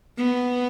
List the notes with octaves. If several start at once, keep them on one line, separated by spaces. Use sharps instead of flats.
B3